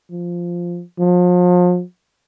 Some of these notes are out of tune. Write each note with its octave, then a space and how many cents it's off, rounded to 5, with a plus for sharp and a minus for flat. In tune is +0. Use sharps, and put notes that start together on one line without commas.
F3 +0
F3 +35